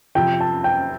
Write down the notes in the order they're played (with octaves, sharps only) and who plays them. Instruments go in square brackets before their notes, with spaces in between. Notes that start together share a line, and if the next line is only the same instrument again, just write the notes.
[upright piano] F2 C3 F3 [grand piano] G5
[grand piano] A5
G5